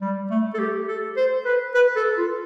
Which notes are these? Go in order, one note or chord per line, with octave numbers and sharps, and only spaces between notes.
G3
A3
A4
G4
A4
C5
B4
B4
A4
F4